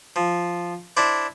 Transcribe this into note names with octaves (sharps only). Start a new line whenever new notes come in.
F3
D4 E4 C5 D5